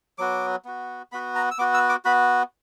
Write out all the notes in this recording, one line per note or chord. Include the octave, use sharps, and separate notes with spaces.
F#3 B3 F#4 D6
B3 F#4
B3 F#4 B5
A#5
E6
B3 F#4 D6
E6
D6
B3 F#4 B5